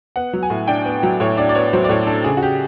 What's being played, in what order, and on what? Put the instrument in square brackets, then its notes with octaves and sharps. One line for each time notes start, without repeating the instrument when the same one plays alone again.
[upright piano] B3 F#5
F#3
G#5
A2
D4 G5
B3
F#3
A2 C#5
D4 D5
D5
B3 C#5
F#3 C5
D5
A2 C#5
D4 A4
C#3 G#4
F#4
G4